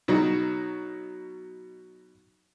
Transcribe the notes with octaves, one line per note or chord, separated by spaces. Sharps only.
B2 F#3 D#4